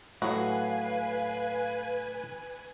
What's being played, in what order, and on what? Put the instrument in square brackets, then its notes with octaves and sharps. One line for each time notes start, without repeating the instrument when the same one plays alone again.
[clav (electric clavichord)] A2 F#3 [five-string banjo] F#4 [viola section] B4 G#5 [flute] F5